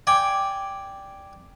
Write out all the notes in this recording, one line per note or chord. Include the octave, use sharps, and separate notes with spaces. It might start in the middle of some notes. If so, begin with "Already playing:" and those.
D5 G5 G#5